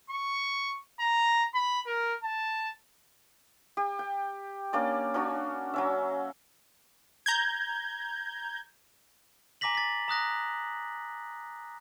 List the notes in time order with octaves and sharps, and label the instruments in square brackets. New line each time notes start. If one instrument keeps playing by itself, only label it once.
[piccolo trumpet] C#6
A#5
B5
A#4
A5
[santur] G4
G5
A#3 C#4 D4 D5
C#4 D4 F#4
F#3 C#4 E5
[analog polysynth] A#5 G6 G#6
[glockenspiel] G#5 A#5 D6 A#6 B6 F#7
A6 B6
A#5 D#6 F#6 A#6